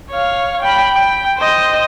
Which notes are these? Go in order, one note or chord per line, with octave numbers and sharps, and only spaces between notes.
C#5 F5
G5 B5
G5
C5 D#5